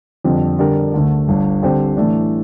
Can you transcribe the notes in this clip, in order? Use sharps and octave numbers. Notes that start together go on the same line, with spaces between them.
F2 D3 G3 C4
D3 G3 D4 G4 A#4
D2 D3 A3
G1 G2 D3
D3 G3 C4 G4 C5
A2 E3 A3 D4